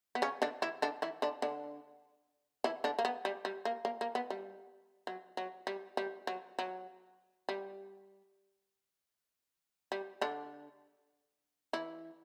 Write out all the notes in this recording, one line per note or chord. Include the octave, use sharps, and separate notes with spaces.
B3
C#3 C#4
D3 D4
E3 E4
D3 D4
E3 E4
D3 D4
D3 D4
E3 E4
D3 D4
A#3
B3
G3
G3
A#3
A#3
A#3
B3
G3
F#3
F#3
G3
G3
F#3
F#3
G3
G3
D3 D4
E3 E4